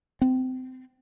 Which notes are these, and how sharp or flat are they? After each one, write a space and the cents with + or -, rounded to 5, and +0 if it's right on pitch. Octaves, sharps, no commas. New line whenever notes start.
C4 -25